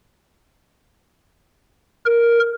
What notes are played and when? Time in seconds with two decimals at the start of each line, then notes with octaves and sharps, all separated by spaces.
2.06 A#4